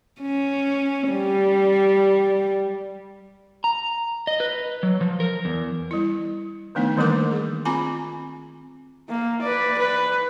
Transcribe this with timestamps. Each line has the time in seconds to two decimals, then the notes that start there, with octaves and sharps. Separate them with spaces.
0.21 C#4
1.11 G3
3.64 A#5
4.27 D#5
4.40 B4
4.83 F#3
5.01 F3
5.20 A#4
5.45 E2
5.91 G3 E4
6.75 D#3 F3 A3 B3 D4 D#4
6.97 D#3 E3 G3 A#3 A#4 D6
7.31 G#4
7.65 C4 F4 G#5 A#5 B5 D6
9.09 A#3
9.42 B4 D5
9.79 B4